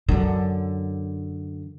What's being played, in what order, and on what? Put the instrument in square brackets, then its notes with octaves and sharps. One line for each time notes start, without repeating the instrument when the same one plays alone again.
[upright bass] F#2 D3